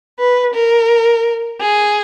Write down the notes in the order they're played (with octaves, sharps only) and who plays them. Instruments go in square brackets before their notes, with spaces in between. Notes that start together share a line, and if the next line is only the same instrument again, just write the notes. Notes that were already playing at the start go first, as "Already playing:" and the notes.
[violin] B4
A#4
G#4